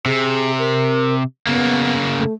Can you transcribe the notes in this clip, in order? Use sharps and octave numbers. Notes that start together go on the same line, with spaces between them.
C3 G#4
A#4
C#3 A#3 B3
A3